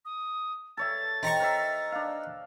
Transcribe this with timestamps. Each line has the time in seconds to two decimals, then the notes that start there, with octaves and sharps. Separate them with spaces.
0.05 D#6
0.77 A4 C#5 E5 A6
1.23 D#4 C5 G5 A#5 C#6
1.40 A#4 C#5 E5
1.92 D4 F5